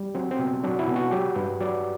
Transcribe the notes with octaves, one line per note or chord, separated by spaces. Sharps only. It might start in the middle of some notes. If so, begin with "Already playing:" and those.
Already playing: G3
F#3 C4
C4
B2
F#3 D4
E4
B2
F#4
F#3 G4
G2 B4
F#3 D5